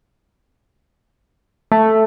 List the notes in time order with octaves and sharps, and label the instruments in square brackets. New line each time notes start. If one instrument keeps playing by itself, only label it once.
[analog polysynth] A3